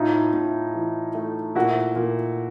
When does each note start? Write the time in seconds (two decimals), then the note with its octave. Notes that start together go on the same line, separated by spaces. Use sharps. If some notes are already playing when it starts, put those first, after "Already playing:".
Already playing: A2 D#4 F4
0.33 A2
0.74 E3
1.15 A3
1.55 A#2 E4 F#4
1.96 A#2